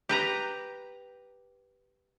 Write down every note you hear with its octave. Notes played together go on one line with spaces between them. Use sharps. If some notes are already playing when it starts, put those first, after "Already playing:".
G4 B4 A#5